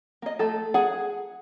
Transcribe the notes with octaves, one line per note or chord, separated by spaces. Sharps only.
A#3 D#5
A3 A4
G#4 F#5